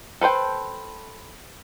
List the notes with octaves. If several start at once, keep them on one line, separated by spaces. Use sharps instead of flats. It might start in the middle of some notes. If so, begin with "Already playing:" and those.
A4 B4 C5 G5